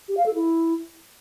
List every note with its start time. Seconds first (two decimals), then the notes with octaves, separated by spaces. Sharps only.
0.09 G4
0.17 F5
0.26 A4
0.35 E4